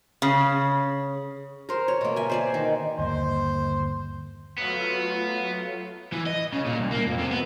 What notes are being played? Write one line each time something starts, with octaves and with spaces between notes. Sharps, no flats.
C#3
A#4 C5
C#5
B2 A#3
E5 G#5
C5 D5 G#5
D#3
G1 D#2 A#3 C5
F#3 A3 B3 F4
E3
D#5
C#3
A#2
C2
A#3
F2
C3
B3